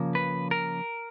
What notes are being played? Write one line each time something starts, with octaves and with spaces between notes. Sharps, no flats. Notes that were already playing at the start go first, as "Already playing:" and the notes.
Already playing: C#3 F3 A#3
B4
A#4